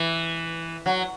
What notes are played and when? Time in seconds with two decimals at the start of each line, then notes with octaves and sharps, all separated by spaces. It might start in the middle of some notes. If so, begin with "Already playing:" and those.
Already playing: E3
0.86 F#3